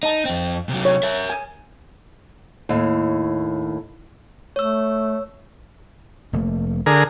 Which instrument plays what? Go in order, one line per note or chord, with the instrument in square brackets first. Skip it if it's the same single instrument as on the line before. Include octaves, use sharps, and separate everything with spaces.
[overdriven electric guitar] D#4 [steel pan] D#5 A5
[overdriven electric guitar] F2 C4
C3 F#3
[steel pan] C#5
[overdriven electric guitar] A#4 E5
[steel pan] G#5
[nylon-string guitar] D#2 A2
[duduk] A3 [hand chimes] C#5 E6
[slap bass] F1 A3 A#3
[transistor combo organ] D3 G#4 A#4